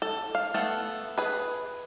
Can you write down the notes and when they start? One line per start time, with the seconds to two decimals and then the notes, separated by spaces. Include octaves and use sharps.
0.02 A4
0.35 F5
0.54 A3 B3 A4
1.18 G#4 B4